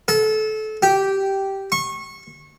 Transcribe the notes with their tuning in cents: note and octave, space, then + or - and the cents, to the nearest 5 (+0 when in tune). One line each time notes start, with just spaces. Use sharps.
A4 -25
G4 -10
C#6 -25